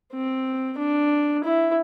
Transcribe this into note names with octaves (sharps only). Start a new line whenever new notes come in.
C4
D4
E4